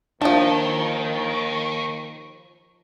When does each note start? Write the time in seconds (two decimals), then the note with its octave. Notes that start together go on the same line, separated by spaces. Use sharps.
0.22 D#2 D#3 F3 D4 A5